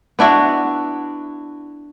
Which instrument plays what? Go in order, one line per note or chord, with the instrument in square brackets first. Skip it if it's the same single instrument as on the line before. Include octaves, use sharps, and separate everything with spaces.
[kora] B3 D4 E4 F#4